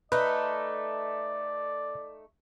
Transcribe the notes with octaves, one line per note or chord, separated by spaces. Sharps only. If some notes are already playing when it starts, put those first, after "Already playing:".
A3 D#4 B4 D5